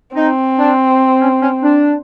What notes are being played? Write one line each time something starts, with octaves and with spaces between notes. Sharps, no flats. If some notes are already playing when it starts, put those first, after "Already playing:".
C4 D#4
D4
C#4
C#4
D4